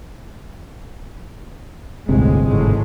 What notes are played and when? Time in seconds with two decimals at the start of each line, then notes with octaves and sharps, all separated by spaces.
2.09 G1 D2 A2 C3 G#3
2.47 G#1 A2 G#3